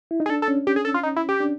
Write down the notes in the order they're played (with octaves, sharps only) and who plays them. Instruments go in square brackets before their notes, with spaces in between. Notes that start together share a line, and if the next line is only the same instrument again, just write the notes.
[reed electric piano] E4
D#4
[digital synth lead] G#4
[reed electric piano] D4 [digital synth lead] A4
[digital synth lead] A4
[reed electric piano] C#4
[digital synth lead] G4
G#4
A4
F4
D#4
E4
G4
[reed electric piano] D4